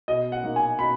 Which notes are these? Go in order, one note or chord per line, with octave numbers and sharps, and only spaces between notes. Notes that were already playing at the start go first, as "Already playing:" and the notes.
B2 D#5
F#5
A#3 D#4
G#5
B2 B5